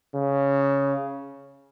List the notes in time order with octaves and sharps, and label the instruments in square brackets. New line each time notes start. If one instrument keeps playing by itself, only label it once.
[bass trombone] C#3